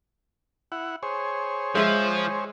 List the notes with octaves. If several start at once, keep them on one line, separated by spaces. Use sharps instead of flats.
E4 F#5
G#4 C5 C#5
F3 G#3 E5